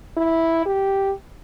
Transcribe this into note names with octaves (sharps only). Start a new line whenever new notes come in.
E4
G4